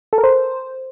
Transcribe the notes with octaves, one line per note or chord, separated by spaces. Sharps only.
A4
A#4
C5